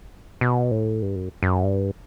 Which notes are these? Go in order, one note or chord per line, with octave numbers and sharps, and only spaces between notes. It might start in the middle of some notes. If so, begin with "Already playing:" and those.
B2
A2
G2
F#2
F#2
G2